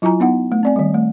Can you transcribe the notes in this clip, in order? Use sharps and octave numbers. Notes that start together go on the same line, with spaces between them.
F#3 E4 F4 G#5 A#5
B3 D#4 F#5
A3
C4 D5 G#5
D#3 G3
A3